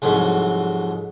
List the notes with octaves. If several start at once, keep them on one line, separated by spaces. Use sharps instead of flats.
C2 F2 G#2 F#3